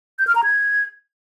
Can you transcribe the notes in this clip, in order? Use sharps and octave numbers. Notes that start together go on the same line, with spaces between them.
G6
F6
A#5
G#6